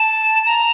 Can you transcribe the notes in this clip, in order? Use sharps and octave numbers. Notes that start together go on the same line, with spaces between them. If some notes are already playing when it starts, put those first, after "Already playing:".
Already playing: A5
A#5